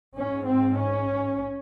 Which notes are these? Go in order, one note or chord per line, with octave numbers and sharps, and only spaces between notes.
G#2 C#4
C4
C#4